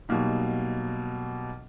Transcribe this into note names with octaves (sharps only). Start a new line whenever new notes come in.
B2 F#3 G3 A#3 D#4